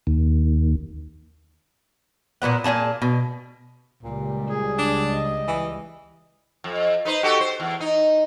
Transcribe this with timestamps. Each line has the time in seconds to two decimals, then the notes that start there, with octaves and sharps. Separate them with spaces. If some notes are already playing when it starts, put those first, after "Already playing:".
0.07 D#2
2.42 A#2 G3 B3 F#5
2.64 A#2 D4 G#4 A5
3.02 B2
4.03 C#2 A#2 G3
4.49 G#4
4.78 D4
5.11 D#5
5.47 E3
6.64 F2
7.05 D#4 B4 C5
7.23 F#4 G4 A4
7.40 C5
7.60 E2
7.80 D#4